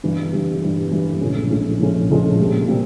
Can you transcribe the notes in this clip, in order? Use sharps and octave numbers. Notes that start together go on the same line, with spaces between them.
G2 E3 G3
G2 E3 G3
G2 E3 G3
G2 E3 G3
A#1 A2 F3 G#3 C#4
A#1 A2 F3 G#3 C#4
A#1 A2 F3 G#3 C#4
A#1 A2 F3 G#3 C#4
C2 A#2 G3 C4
A#2 G3 C4